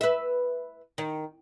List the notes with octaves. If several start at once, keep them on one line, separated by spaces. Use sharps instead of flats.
B4 E5
D#3